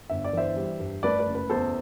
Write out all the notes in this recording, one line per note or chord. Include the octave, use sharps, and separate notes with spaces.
G1 E5
D5
E3 C5 E5
G3
G2
A3 B4 D5
B4
F#1
B4
E2 A4 C5